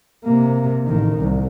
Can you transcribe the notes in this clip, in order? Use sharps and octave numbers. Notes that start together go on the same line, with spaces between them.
C3 A#3
A1 D#3
C2